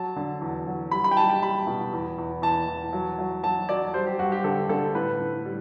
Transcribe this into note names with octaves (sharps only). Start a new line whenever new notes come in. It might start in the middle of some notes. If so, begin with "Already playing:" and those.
Already playing: F#3 A5
D3
E2
F#3
G3 B5
B5
G5
G3 A5
G5
G3 B5
B2
E2
E2
E2 A5
E2
F#3
F#3
F#3 A5
F#3 D5
G3 C5
G4
G2 F#4
G4
D3 A4
D3 A4
A2 B4
A2
G3